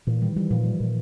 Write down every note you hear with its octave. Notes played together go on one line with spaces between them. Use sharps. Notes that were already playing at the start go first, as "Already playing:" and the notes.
A#2 E3
D#3 G3
E3 G3
A#2 F3
G3
A#2